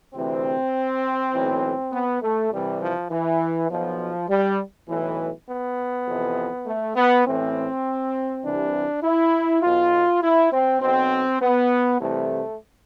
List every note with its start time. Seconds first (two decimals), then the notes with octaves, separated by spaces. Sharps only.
0.14 D2 C3 E3 C4
1.33 B1 A2 E3
1.92 B3
2.22 A3
2.51 C2 C3 E3 G3
2.81 F3
3.10 E3
3.69 B1 B2 F3
4.29 G3
4.88 B1 A2 E3
5.48 B3
6.07 F2 C3 E3
6.66 A3
6.95 B3
7.25 A1 A2 E3 C4
8.44 C2 C3 E3 D4
9.03 E4
9.62 B1 B2 F4
10.22 E4
10.51 C4
10.81 B1 B2 C4
11.41 B3
11.99 C2 C3 E3 A3